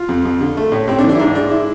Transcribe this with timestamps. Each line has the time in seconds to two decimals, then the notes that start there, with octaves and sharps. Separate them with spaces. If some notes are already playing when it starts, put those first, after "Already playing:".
Already playing: F4
0.09 F2
0.25 F2
0.41 D3
0.57 A3
0.72 A2
0.88 A2 C4
0.99 D4
1.04 E3
1.09 D4
1.15 E4
1.19 G#2 D4
1.35 G#3 D4
1.51 E4